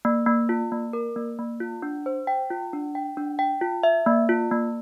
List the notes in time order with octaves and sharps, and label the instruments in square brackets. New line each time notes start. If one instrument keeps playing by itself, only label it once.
[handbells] A#3
A#3
F4
A#3
A#4
A#3
A#3
F4
D4
C5
G5
F4
D4
G5
D4
G5
F4
E5
A#3
F4
A#3